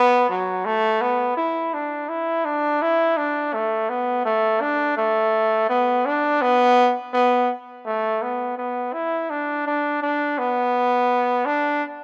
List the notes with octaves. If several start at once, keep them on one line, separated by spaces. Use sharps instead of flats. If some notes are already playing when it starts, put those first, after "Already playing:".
Already playing: B3
F#3
A3
B3
E4
D4
E4
D4
E4
D4
A3
B3
A3
D4
A3
B3
D4
B3
B3
A3
B3
B3
E4
D4
D4
D4
B3
D4